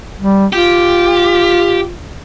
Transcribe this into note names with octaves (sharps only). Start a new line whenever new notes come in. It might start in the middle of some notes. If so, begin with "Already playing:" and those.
G3
F4 G4